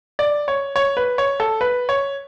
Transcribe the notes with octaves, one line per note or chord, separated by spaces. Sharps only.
D5
C#5
C#5
B4
C#5
A4
B4
C#5